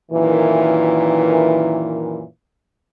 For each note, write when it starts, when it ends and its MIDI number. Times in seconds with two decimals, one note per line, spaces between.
0.12 2.24 42
0.12 2.24 46
0.12 2.24 51
0.12 2.24 52